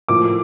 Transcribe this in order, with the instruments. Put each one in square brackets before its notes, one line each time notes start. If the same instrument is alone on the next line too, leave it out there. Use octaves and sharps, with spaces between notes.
[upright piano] A2 F3 A#3 D6